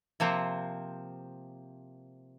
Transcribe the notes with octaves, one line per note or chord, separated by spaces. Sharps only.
C3 F3 A#3 C4